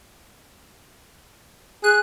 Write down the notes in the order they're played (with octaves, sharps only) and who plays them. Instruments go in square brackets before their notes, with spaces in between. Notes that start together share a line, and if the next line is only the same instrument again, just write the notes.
[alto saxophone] G#4 [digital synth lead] F#6